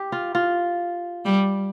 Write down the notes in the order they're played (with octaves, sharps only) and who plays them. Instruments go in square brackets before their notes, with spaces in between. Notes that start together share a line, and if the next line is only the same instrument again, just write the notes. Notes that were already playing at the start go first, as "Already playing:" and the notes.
Already playing: [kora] G4
F4
F4
[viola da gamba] G3